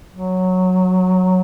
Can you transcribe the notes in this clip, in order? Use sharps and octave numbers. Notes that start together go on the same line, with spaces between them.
F#3